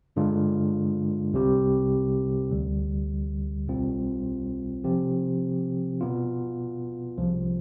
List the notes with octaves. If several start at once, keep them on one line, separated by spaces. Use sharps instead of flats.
G2 D3 G#3 D4 F4
C2 C3 G3 C4 G4
D2 D3 G3
B1 B2 G3 C4 F4
C3 F3 C4 G4
B2 B3 F4
C2 C3 F3